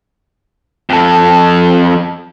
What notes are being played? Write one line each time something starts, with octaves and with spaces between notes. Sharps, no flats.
F2 A4